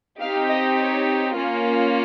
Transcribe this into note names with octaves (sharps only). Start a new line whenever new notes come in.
C4 D#4 G4 F5
D#5
C#5
A#3 C#4 F4